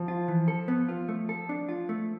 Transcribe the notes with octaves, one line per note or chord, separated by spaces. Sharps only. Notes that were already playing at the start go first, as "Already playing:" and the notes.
Already playing: F3
F4
E3
A4
B3
F4
A3
A4
D4
F4
A3